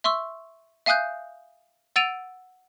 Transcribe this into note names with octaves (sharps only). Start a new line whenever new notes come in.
E5 C6 C#6 E6
E5 F5 G#5 D#6 F#6 G6
F#5 E6 A6 D7 D#7 F7